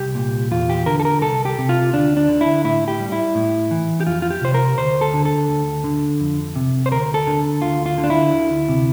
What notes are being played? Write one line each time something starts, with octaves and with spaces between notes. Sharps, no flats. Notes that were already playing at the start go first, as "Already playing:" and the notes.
Already playing: C2 G4
A#2
E2 F4
G4
D3 A#4
A4
A#4
C2 A4
G4
C3
F4
D2 D4
D4
D3
E4
A2 E4
G4
G3
E4
A2
E3
G4
F2 F4
F4
G4
C3 C5
A#4
D2 C5
A4
D3
A4
D2
D3
F2
C3
C5
D2 A#4
A4
D3
D2 F4
F4
D3
D4
E4
D2
C3